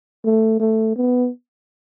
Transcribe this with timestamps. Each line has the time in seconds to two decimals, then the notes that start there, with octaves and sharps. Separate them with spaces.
0.24 A3
0.60 A3
0.96 B3